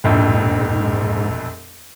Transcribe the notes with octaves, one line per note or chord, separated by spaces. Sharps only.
E1 A#1 F2 G#2